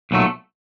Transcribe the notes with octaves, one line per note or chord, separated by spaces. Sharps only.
B1 A#2 F#3 A3